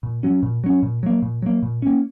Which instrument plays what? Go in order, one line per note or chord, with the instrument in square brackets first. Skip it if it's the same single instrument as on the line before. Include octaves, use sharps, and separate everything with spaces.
[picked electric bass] A#2
F#3 C#4
A#2
F#3 C#4
A#2
F#3 A#3
A#2
F#3 A#3
A#2
A#3 C#4